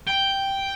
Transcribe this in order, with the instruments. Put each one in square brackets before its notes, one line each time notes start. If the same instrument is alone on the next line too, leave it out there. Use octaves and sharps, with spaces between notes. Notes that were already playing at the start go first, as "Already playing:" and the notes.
[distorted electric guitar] G5